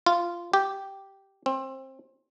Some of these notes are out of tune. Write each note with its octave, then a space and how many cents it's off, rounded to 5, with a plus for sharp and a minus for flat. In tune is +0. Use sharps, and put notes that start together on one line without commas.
F4 -10
G4 -5
C4 +25